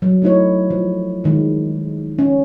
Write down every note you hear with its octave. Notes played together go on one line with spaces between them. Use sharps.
F#3
A3 D#4 E4 C#5
F3
D#3 G#3
C#4